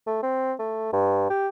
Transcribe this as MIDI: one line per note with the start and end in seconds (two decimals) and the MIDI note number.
0.07 0.20 57
0.23 0.53 60
0.59 0.90 57
0.93 1.29 43
1.30 1.48 67